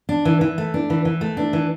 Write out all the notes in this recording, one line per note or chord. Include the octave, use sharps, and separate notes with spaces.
D4
E3
E3
A3
D4
E3
E3
A3
D4
E3